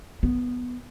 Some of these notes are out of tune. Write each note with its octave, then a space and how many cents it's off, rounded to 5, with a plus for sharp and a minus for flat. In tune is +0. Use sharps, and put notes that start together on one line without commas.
B3 +0